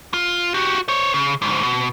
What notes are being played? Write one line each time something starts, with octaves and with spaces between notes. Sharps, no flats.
F4
F#4 G4
C5 C#5
C#3
D2 G#2
B2